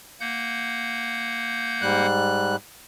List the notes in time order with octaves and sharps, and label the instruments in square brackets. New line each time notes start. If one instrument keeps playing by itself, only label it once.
[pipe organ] A#3 F#5 G6
[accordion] G#2 G3 F#6